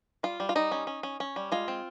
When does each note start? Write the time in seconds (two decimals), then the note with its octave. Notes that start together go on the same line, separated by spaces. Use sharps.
0.23 G3 F4
0.40 G3
0.49 F4
0.55 G3 D#4
0.72 C#4
0.87 C#4
1.03 C#4
1.20 C#4
1.36 G3
1.52 G#3 F4
1.68 C4